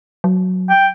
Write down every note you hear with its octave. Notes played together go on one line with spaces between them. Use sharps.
F#3
G5